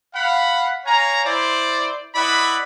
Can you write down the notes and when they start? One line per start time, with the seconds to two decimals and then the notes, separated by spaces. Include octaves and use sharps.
0.15 F5 F#5 B5
0.85 C#5 F5 G#5 A#5
1.25 E4 C5 D5
2.15 E4 B4 D5 D#5 F#5 B5